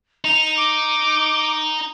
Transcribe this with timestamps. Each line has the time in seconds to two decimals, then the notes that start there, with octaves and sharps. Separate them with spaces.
0.25 D#4 F7
0.57 D6